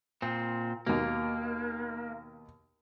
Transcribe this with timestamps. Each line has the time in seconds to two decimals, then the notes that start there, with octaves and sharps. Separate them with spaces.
0.22 A#2 C4
0.87 D#2 B2 A#3